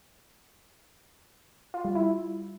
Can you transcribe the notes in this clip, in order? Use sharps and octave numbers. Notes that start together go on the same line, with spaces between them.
F4
G3
E4